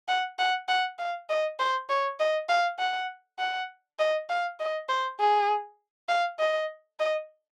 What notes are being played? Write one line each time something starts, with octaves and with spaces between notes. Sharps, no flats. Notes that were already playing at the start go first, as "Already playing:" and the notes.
F#5
F#5
F#5
F5
D#5
C5
C#5
D#5
F5
F#5
F#5
D#5
F5
D#5
C5
G#4
F5
D#5
D#5